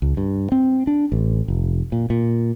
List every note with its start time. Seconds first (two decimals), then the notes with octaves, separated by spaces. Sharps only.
0.02 C#2
0.17 G2
0.52 C4
0.87 D4
1.12 A1
1.48 F1
1.92 A#2
2.10 A#2